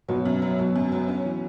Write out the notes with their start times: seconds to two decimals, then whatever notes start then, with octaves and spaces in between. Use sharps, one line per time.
0.08 B1 B2 F#3
0.25 F#2
0.42 F#3
0.59 B1 B2 F#3
0.76 F#2
0.92 F#3
1.08 C#4
1.25 E3